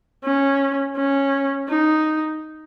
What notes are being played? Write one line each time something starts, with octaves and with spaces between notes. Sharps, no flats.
C#4
C#4
D#4